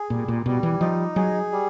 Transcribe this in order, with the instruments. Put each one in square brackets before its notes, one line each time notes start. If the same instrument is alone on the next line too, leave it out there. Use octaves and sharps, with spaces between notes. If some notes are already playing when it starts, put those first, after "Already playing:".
Already playing: [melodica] G#4
[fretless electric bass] A#2 [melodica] G3
[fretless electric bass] A#2
[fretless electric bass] B2 [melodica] G3
[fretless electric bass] E3
[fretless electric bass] F3 [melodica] D#4
[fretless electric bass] F#3 [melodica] G#4
[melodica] G3